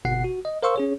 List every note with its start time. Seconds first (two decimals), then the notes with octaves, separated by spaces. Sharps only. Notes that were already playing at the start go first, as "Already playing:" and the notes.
0.05 G1 B2 F#5 C7
0.24 F#4
0.45 D#5
0.63 A#4 C5 F5 C6 C#6 E6
0.76 C#4 G#4 C#5